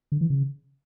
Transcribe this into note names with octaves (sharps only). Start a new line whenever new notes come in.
D3
E3
C#3